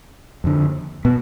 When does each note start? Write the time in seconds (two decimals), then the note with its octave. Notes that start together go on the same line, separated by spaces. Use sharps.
0.44 F2 D3
1.05 B2 B3